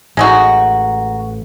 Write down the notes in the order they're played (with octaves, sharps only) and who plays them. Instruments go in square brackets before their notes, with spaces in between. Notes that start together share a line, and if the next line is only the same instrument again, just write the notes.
[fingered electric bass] A1 [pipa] G#3 D#4 F#4